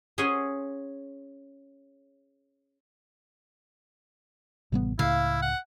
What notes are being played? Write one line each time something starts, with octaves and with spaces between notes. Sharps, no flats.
C#4 G#4 C#5 F#5 G#5 C6
A1 C3 G3 B3
C#2 A2 C#3 E4 F5
F#5